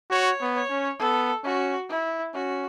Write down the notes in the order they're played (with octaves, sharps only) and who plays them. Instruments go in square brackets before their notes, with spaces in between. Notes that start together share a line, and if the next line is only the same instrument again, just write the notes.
[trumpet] F#4 [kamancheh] C#5
[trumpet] B3
[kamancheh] C#5
[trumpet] C#4
[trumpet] B3 [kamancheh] A4
[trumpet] C#4 [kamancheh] F#4
[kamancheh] E4
[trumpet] C#4 [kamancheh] F#4